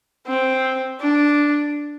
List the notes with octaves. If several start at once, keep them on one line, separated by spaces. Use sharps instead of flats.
C4
D4